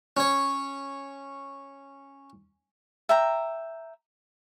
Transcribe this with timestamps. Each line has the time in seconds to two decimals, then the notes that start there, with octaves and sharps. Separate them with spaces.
0.17 C#4 C#5
3.09 E5 G5 A#5